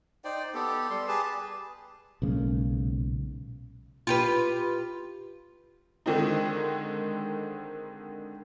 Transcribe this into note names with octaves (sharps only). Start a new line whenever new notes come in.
D#4 C5 D5 G5
B3 G4 A4
G3 A4 C6
G4 G#4 B4 A5
B1 A#2 C#3 G#3
F4 G4 B4
D3 D#3 G#3 C4 D#4